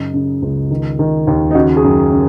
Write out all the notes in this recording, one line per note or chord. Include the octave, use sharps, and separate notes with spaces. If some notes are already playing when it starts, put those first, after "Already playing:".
Already playing: F#2 C#3 D#4
C#3
C#2
D#3
D#3
D#2
D#4
C#3 F#4
G#4
F#2
C#3